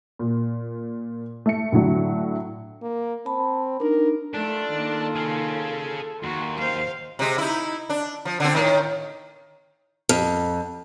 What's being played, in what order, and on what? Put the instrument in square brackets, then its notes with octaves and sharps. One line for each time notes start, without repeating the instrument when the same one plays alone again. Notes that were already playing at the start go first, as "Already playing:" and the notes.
[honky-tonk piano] A#2
A3 C#7
A2 D3 F#3 A3
[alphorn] A#3
[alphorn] C4 [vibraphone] A5 B5
[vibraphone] D4 D#4 [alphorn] A#4
[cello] A3 [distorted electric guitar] D4 [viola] F4 A4
[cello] D#3 A#3
[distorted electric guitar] G#4 F5
[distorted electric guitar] D#2 [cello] F#4 [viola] C6
[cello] C5 F5
[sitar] C3 G#3
D#4 E4
D4
F3
D3 C4
A2 D#3
[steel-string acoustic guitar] F2